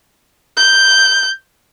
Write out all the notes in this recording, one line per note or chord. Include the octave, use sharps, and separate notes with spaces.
G6